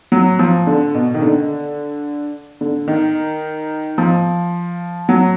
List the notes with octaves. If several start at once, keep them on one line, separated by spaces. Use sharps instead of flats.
F#3
F3
D3
B2
D#3
D3
D3
D#3
F3
F#3